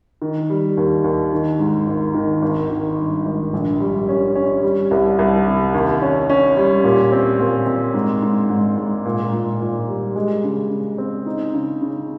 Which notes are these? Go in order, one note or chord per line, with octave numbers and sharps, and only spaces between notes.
D#3
G3
D#2
D#2
D#3
G#2
G#1
D#3
G#1
D#3
G2
G#1
A#1
G3
C#4
C#4
G3
C2
C2
C3
D#2
C#4
C#4
G3
A#2
C4
A#2
C4
G#2
G#2
G#2
G#2
A#2
A#2
A#2
G3
G#3
C#3
C#3
C4
D#4
C#3
C#3